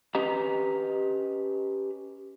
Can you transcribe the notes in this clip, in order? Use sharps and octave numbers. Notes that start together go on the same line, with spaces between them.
C#4 G4 B4 D#5 A#5